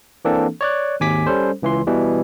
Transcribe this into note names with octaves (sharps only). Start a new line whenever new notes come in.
E3 A#3 C4 D4 A4
C#5 D5 F#6
G#1 D#2 G#5 D6 B6
G3 C#4 A4 C5
C#2 E3 C6
B2 E3 G3